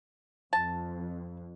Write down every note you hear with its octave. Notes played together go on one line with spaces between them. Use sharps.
F2 A5